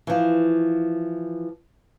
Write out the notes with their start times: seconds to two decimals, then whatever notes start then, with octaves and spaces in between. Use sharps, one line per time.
0.07 E3 F3